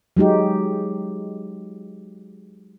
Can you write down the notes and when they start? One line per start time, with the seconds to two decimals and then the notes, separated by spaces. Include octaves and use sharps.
0.17 F#3 G#3 D#4 G4